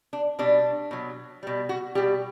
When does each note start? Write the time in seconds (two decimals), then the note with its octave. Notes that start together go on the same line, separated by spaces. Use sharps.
0.13 D4
0.39 B2 G3 D4
0.91 B2 F#3
1.43 B2 G3
1.69 F#4
1.95 B2 G3 G4